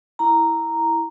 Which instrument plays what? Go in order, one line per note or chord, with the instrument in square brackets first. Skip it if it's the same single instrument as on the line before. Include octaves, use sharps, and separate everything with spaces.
[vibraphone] E4 A#5